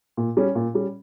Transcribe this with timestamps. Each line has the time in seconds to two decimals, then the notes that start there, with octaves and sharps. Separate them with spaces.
0.17 A#2
0.37 G3 C#4
0.55 A#2
0.74 G3 C#4